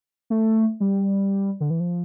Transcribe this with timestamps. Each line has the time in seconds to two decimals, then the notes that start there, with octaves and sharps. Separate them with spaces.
0.30 A3
0.80 G3
1.60 D3
1.70 E3
1.80 F3